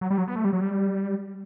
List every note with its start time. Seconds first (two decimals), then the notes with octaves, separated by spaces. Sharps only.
0.01 F#3
0.10 G3
0.18 F#3
0.28 B3
0.36 A3
0.45 G3
0.53 F#3
0.61 G3